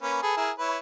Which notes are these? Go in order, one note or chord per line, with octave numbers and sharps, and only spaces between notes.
A#3 C#4 B4
G#4 A4 B4
E4 G#4 A#4
E4 B4 C#5